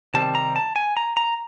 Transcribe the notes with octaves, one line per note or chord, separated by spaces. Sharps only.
C3 D#3 G3 C4 A5
A#5
A5
G#5
A#5
A#5